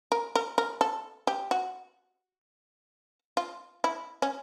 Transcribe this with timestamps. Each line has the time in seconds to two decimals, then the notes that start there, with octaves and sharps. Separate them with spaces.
0.12 A#4
0.35 A#4
0.58 A#4
0.81 A4
1.27 G4
1.51 F#4
3.37 F4
3.84 E4
4.22 C#4